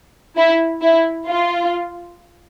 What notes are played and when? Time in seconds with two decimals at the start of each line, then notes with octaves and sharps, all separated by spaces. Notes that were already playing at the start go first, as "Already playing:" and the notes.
0.36 E4
0.81 E4
1.27 F4